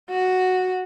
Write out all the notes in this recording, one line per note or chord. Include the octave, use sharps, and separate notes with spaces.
F#4